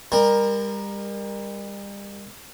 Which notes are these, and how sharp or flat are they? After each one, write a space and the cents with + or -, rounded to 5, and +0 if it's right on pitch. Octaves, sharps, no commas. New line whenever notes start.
G3 +40 A#4 +10